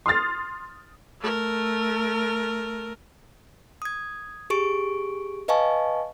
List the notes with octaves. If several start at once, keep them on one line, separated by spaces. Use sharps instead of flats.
C6 D#6 F6 A6
A3 A#4
D#6 G#6
G4 G#4 C#6 D7
B4 D#5 F5 G#5 A5 C#6